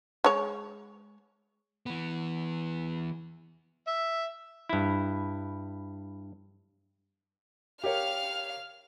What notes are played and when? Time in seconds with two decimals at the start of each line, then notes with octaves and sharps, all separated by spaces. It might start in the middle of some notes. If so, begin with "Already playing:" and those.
0.24 G#3 C#5
1.86 E3 B3
3.87 E5
4.69 G2 E4
7.84 G4 A#4 C#5 F5 F6